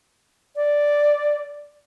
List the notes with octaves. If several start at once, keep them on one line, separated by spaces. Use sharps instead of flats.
D5